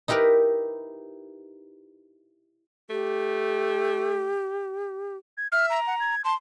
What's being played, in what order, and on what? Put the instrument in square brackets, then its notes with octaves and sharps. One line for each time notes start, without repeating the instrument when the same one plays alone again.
[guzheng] D#4 E4 G4 A#4 B4
[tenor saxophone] A3 [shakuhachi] G4
[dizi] G#6
[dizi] E5 [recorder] F6
[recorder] A#5
[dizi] F#5
G#6
[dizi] A5 [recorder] C6